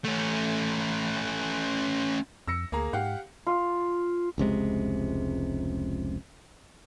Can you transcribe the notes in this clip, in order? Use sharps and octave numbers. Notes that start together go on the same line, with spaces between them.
A3 C#4
F2 E6 A#6 C#7
D2 A#3 G#4 A#5
G#2 G4 F5 F#5
F4
F1 C#2 C3 G#3